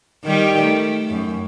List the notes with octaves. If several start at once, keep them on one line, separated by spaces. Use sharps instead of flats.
D#3 G3 G4
A3
F#2